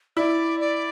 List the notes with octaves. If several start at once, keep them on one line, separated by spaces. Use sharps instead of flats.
E4 D5
D5